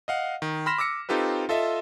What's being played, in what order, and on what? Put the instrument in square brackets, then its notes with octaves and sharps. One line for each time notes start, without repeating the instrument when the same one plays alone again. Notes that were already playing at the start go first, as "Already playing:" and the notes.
[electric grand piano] D#5 F5 F#5
D#3
B5 C6 F6 A#6 B6 E7
D6 E6 A#6 C#7
C4 D#4 F4 G4 A4 B4
F4 A4 D#5 E5